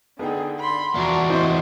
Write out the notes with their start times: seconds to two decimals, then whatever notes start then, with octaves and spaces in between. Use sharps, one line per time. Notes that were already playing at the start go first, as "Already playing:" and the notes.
0.19 D3 B3 D#4 G#4 G5
0.59 B5 C6
0.95 E2 F3 D4 F#4 A#5
1.30 A1 E3 C4 C5 D#5